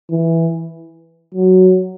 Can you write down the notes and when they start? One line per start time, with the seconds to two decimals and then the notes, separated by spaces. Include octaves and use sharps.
0.11 E3
1.34 F#3